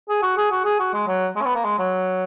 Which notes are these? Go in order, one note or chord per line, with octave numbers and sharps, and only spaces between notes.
G#4
F#4
G#4
F#4
G#4
F#4
G#3
F#3
G#3
C#4
B3
A#3
G#3
F#3